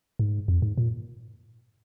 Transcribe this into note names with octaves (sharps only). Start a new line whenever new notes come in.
G#2
F2
G#2
A#2